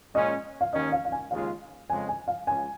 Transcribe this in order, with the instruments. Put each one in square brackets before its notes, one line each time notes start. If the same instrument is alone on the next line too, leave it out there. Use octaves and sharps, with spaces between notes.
[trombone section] A#2 G#3 C#4 [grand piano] D#5
[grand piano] F5
[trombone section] D#2 D#3 C#4 [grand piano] D#5
[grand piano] F5
F5
G#5
[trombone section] D#2 C#3 G#3 F4 [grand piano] F5
[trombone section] F2 C#3 G#3 [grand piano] G#5
[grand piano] G#5
F5
[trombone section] C#2 C#3 [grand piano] G#5